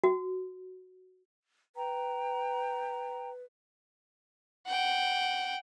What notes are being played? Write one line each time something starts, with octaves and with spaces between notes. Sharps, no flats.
F#4
B4 G5 A#5
F#5 G5